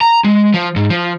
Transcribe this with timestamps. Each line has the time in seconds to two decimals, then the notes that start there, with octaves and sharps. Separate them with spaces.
0.01 A#5
0.24 G#3
0.54 F3
0.76 G#2
0.90 F3